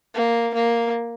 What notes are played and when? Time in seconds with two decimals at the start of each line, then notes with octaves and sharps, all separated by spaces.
0.14 A#3
0.54 A#3